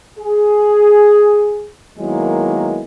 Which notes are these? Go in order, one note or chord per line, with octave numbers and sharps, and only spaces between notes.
G#4
D#3 F#3 G#3 A#3 B3 E4